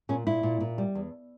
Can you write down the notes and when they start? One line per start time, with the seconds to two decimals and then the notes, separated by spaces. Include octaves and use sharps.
0.09 A#2 C#4
0.27 A#2 E4
0.43 A#2
0.60 A#2
0.78 G3
0.95 E2